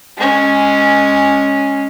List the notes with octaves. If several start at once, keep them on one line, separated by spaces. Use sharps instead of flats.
G#3 C#4